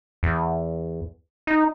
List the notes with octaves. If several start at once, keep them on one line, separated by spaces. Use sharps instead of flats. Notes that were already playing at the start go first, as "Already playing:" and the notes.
E2
D#4